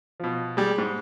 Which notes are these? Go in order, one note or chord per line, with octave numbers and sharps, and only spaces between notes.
B2 F3
G3 G#3
G#2